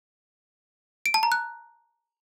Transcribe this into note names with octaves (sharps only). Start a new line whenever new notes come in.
D7
A5
A#5
F#6